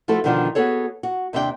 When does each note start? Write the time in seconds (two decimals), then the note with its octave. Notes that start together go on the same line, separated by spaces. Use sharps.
0.08 F3 A3 E4 F#4 A4
0.24 B2 D3 D#3 F3 D4 F4
0.55 B3 F#4 G#4 A4 C#5
1.03 F#4
1.33 D#2 C3 C4 D4 F4 G5